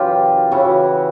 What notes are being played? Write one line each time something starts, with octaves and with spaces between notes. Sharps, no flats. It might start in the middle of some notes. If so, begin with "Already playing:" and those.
Already playing: F#2 C#3 E3 F4 G4
C#3 E3 E4 F#4